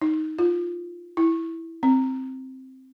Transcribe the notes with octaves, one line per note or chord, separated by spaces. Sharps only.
D#4
F4
E4
C4